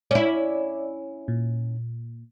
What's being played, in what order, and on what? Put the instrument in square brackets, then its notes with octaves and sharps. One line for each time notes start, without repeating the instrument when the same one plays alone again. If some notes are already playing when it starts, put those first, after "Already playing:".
[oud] C#4 E4 [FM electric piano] D5
[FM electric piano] A#2